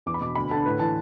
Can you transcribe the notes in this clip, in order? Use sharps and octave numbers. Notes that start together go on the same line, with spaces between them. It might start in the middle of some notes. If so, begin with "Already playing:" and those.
E2 D6
B5
B2 D6
D2 B5
D3 A5
A2 B4
E3 A5